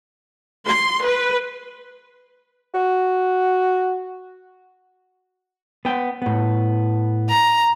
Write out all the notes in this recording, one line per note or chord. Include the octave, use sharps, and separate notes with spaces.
C6
B4
F#4
B3 G5
A2 B3
A#5